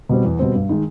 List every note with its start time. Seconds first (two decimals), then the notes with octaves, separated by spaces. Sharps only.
0.09 B2 G3 C4
0.25 E2
0.39 B2 G3 C4
0.54 G2
0.69 D#3 G#3